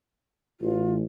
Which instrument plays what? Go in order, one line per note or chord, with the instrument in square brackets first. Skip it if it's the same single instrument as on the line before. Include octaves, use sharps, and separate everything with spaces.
[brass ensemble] A1 [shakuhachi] F4